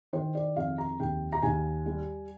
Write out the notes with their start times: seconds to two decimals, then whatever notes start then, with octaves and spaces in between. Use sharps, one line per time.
0.13 D#3 C5
0.35 D5
0.56 F2 F5
0.78 A#5
1.00 D#2 G5
1.32 A#5
1.42 D#2 G#5
1.86 G3